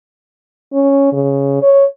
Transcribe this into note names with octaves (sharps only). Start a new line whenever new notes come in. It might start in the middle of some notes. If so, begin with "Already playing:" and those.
C#4
C#3
C#5